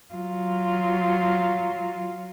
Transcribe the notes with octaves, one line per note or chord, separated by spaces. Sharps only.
F#3 F4